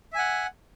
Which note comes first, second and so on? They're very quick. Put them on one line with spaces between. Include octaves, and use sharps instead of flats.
E5 G#5 F#5